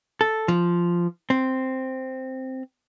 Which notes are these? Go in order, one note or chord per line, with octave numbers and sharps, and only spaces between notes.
A4
F3
C4